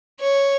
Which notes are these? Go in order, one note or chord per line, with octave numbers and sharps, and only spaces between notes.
C#5